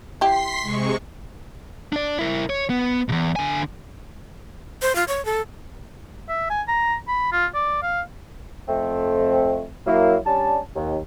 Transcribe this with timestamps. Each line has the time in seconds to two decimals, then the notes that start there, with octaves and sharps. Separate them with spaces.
0.21 E4 G4 C6 B6 C7
0.60 C3 G#3 C#6
1.93 D4 D5
2.19 E4 A#4
2.50 C#5
2.70 B3
3.09 E2 B2
3.36 D3 G#5
4.82 C5
4.95 F4
5.08 C#5
5.25 A4
6.29 E5
6.50 G#5
6.68 A#5
7.08 B5
7.32 F4
7.55 D5
7.82 F5
8.69 F2 A3 C4
9.86 F#3 A#3 E4
10.26 G3 C#4 D4 A5
10.76 D#2